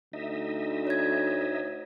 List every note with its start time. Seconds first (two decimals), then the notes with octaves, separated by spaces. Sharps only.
0.13 D2 D#4 D#5 E5
0.87 C#5 G#6